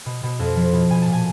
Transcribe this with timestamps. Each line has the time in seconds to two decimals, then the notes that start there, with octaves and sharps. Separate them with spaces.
0.06 B2
0.23 B2
0.39 F2
0.56 F3
0.73 B2
0.90 B2 G#5
1.02 A5
1.07 A#2
1.13 G#5